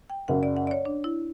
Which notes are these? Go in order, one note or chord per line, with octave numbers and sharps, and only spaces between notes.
G5
F#1 F#2 C#3 F#5
D5
F#5
D5
C#5
D4
E4